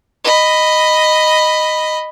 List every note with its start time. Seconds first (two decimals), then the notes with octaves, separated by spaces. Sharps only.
0.24 D#5 B5